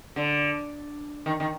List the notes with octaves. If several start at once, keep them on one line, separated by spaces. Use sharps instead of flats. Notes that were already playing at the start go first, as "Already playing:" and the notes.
D3
D#3
D#3